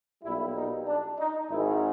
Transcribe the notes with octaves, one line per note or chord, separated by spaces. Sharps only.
B1 A#2 G3 E4
D#4
D4
D#4
G#1 G#2 D#3 G#3 E4